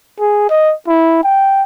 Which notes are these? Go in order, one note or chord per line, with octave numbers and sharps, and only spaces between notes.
G#4
D#5
E4
G5